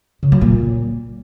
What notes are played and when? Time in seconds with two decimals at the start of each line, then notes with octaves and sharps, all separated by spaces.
0.23 C#3
0.32 F#3
0.41 A#2